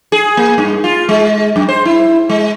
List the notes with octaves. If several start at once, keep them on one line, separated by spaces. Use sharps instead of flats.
G#4
A#3
G2
F4
G#3
F#2
C5
E4
G#3